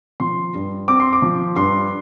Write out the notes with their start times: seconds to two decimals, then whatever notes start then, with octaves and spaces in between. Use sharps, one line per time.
0.20 F3 C6
0.55 G2
0.88 C4 D6
1.00 C6
1.13 D6
1.22 F3
1.56 G2 C6